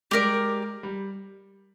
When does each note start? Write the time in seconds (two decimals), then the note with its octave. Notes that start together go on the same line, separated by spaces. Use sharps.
0.11 G#3 G4 A#4 D5
0.83 G3